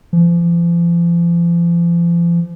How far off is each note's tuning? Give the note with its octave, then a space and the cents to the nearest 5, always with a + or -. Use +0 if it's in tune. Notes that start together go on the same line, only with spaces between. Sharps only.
F3 -40